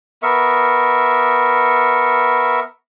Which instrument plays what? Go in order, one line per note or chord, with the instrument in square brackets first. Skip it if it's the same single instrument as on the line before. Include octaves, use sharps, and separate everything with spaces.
[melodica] B3 A#4 E5 C#6